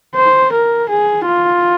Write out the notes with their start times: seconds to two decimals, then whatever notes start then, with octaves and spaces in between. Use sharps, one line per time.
0.15 C5
0.52 A#4
0.89 G#4
1.26 F4